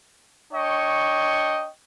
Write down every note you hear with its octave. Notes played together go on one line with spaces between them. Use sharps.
D4 C#5 D#5 G5 C#6